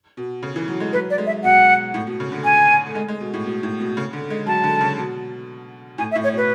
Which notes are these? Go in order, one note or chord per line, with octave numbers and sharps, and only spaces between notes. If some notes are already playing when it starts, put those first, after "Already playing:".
B2
C#3
E3
F#3
G#3
F#3 B4
D5
G#3
E5
B2 F#5
A2
B2
C#3
D3
G#5
A3
G#3
G#3
B2
A2
B2
A2
B2
C#3
D3
G#3
F#3 A5
D3
C#3
B2
A2 G#5
E5
A2
C#5
B2 B4